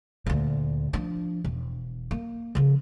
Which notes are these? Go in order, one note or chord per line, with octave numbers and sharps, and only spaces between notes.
D2 A#2
F3 D4
E1
A#3
C#3 F3